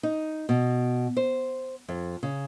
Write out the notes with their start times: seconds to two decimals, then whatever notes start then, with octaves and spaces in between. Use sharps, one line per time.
0.03 D#4
0.49 B2
1.17 C5
1.89 F2
2.23 C#3